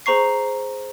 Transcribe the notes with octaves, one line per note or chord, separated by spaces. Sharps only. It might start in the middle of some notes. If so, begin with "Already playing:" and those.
G#4 C5 A#5 C#6 C7